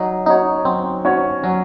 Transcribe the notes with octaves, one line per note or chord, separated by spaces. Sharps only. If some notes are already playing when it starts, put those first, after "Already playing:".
Already playing: F#3 D#4
C#4 D#4 F#4 C#5
F#3 C4
C#4 F#4 C#5
F#3 C#4